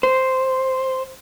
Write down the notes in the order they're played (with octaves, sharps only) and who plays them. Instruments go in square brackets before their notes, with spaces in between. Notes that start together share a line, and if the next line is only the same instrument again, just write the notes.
[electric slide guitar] C5